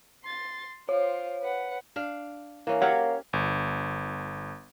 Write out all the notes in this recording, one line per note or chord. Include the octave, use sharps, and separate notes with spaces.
C6 A6
F4 C5 C#5
B4 F#5
D4 F5
E3 A#3 C#4
G4 C#5 F5 F#5
G1